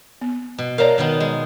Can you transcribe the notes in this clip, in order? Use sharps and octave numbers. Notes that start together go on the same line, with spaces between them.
B3
B2
A#4 C#5 D5 F5 A5 A#5
B2 D#3 B3
G#3